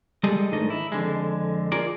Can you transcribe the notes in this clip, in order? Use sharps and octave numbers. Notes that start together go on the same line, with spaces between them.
G3 G#3 G4 A4 D#5
G#2 D#3 A3 D4 D#5
E4
F2 D3 G#3
F4 G#4 A#4 D5